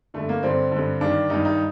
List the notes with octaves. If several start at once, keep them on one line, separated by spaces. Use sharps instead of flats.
G2 D3 A3
A#3
G2 D3 C4
G2 D3
G2 D#3 D4
G2 D#3 D#4
D#4